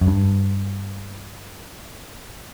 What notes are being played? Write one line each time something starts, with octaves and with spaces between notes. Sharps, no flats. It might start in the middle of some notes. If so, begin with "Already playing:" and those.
F#2
G2